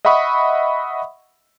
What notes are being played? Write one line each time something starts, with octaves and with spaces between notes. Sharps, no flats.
D#5 E5 F#5 B5 C#6 D#6